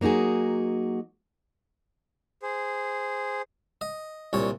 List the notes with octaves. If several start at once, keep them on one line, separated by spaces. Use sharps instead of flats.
F#3 A#3 D#4 F#4 G#4
G#4 C5
D#5
C2 A#2 C#5